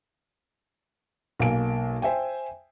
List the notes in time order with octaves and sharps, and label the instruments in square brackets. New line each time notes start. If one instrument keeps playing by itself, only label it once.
[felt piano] B1 A#3 F5 G#5 D7
C5 E5 G5 G#5